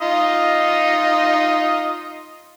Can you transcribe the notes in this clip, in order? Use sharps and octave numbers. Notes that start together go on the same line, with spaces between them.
D#4 F4 D#5